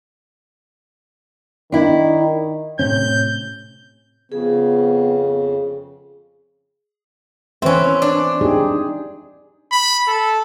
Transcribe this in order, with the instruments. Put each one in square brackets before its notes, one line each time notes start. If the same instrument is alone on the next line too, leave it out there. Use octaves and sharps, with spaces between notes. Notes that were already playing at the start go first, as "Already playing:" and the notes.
[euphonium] D#3 [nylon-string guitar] D4 E4
[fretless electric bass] A2 C3 C#4 [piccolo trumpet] G6
[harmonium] F2 C#3 [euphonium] B3 [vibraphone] G#4
[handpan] E3 B4 E5 [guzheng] C4 C#4
[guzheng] D4
[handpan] D#4 G4 G#4
[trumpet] B5
A4